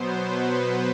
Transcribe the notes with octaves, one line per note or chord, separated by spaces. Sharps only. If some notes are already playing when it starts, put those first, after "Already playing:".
Already playing: B2 F#3 B3 C5
B4
C5